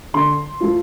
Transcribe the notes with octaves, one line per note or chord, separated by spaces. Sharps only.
D3 C6
F3 A3 F4